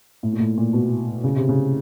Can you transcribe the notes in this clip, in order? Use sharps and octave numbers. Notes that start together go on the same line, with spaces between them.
A2
A#2
A2
A#2
B2
C#3
C3
C#3